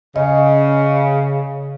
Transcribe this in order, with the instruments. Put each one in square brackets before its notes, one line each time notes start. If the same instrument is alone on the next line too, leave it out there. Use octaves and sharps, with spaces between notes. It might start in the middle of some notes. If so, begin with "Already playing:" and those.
[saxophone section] C#3 [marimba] D#5